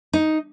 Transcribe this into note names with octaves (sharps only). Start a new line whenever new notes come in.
D#4